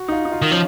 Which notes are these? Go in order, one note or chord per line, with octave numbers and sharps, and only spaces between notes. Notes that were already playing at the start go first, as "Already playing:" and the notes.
Already playing: F#4
D#4
F4
D#4
F4
D#3
F3 C#4